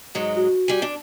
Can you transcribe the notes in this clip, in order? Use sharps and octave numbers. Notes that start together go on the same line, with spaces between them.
G#2 F#3 G#3
F#4
G3 G#5
D4